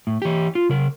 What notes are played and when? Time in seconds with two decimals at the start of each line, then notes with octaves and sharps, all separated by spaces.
0.07 A2
0.22 E3 G4
0.55 F4
0.69 C#3 A#4